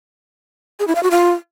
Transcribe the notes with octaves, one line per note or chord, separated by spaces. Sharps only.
G#4
E4
F5
F#4
F4